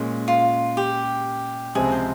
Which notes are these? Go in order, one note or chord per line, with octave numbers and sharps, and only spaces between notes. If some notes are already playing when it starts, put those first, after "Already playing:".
Already playing: A#2 G#3 C#4
F4
G4
C#2 C3 F3 G#3 C4 G#4
C5